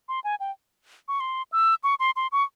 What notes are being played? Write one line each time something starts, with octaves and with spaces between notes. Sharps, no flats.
C6
G#5
G5
C#6
C6
E6
C#6
C6
C6
C#6